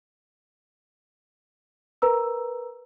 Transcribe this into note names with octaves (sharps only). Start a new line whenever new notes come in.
A#4 B4 A#5 E6